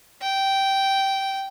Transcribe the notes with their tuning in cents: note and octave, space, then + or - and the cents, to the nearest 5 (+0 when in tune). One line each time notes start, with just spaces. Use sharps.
G5 -10